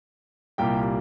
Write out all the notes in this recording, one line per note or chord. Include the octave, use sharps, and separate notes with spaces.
C2 A#2 G3 A#3 G4 G5